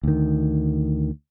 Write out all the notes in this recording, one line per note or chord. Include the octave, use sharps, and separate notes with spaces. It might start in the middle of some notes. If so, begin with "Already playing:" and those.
D2 D#3